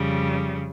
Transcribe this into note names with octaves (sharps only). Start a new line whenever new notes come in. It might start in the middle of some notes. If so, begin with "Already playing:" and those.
Already playing: F2 C#3 G3